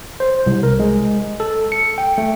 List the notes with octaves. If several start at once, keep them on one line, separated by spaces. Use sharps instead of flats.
C5
C2
A#4
G#3
A4
C#7
G5
A3